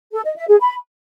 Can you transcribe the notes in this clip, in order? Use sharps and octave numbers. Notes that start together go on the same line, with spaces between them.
A4
D#5
E5
G#4
B5